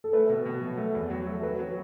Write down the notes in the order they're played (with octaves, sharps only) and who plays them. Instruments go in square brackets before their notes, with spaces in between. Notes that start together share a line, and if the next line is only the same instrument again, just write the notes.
[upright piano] A4
[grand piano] A3 [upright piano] B4
[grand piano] B2
B2
F#3
A3
E2
F#3
[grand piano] A3 [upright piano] A4
[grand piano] F#3 [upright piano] B4
[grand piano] F#3